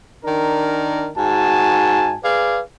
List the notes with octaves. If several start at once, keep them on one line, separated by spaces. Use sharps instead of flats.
D#3 D4 A#4
G#2 F#4 G#5 A5
G#4 B4 D5 F5